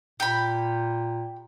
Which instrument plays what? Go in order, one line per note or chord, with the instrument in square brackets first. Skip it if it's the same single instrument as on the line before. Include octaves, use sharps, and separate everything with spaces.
[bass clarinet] A#2 [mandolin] G4 B5